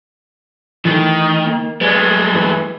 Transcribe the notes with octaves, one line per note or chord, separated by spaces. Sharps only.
D#3 E3 A3
A#3
G#3 A3 B4 D5
G2 E3 B4